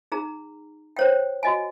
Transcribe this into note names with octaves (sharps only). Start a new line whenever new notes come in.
D#4 G#4 A#5
C5 C#5 G5
F#4 D#5 G#5